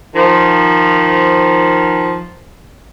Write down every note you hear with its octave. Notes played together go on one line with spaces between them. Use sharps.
D#3 F3